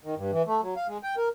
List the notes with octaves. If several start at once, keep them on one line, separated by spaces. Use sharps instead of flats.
D#3
G2
E3
A3
F#3
F5
G#3
G5
A#4